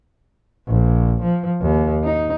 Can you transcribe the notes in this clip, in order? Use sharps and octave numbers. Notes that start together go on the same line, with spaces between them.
A#1
F3
D#2
D#4